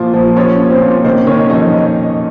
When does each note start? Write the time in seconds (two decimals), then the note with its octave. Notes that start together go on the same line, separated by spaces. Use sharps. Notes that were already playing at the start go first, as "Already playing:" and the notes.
Already playing: A#2 F3 F4
0.14 F3
0.36 F3 C#4 C#5
0.59 A#2
0.70 C4 C5
0.82 A#2
1.04 D#3 C4 C5
1.27 D#3 C#4 C#5
1.50 F2 D#4 D#5